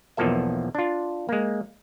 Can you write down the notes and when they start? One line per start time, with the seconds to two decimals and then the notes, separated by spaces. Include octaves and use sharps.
0.17 B1 E2 F3 A#3 A4 E5
0.75 D4 F4
1.29 G#3 A#3